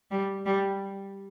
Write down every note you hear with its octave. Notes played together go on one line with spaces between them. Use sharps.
G3
G3